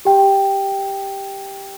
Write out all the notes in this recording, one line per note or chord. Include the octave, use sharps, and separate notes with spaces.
G4 G5